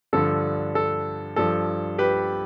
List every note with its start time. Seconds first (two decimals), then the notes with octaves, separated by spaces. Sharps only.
0.13 G2 D3 F3 A4
0.75 A4
1.36 G2 F3 A4
1.98 G4 B4